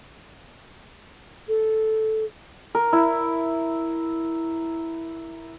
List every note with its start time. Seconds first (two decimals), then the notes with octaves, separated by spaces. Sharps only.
1.48 A4
2.75 A#4
2.93 E4